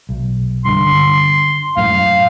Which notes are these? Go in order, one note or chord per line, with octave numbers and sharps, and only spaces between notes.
B1
G2 D3 C6
F#2 A2 F5